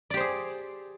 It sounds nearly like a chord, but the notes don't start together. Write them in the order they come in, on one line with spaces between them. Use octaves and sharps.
D5 G4 C5 G#4